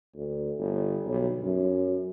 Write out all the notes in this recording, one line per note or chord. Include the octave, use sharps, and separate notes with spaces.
D2
G1
B1
F#2